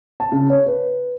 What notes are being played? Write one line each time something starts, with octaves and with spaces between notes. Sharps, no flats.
A5
C#3
C#5
B4